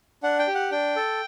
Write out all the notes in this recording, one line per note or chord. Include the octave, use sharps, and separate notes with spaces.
D4 F#5
G5
G4
F#5
D4 G5
A4